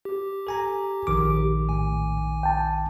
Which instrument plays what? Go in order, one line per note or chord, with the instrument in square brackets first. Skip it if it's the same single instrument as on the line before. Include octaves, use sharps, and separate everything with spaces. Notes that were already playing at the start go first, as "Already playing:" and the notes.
[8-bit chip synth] G4
[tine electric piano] A4 G#5 A#5
A#1 D#3 D6
[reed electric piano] A2 [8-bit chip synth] G#5
[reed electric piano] G5 A5